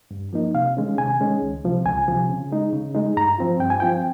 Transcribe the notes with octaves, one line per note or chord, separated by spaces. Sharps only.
G2
F3 A#3 D#4
C3 F5
D#3 G#3 C#4
C3 G#5
D#3 G#3 C#4
C#2
C3 F3
C#2 G#5
C3 F3
C#3
G#3 D#4
C#3
G#3 D#4
G2 A#5
F3 C4 F4
G2 G5
G#5
F3 C4 F4 G5